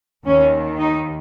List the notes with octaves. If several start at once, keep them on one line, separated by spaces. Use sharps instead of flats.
D#2 D#3 C#4
D#4